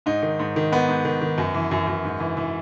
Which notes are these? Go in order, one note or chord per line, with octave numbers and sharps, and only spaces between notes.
G#2 D#4
D#3
G#2
D#3
G#2 B3
G#2
D#3
D#3
F#2
E3
F#2
F#2
G#2
E3
E3